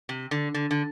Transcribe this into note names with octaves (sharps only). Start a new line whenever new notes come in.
C3
D3
D3
D3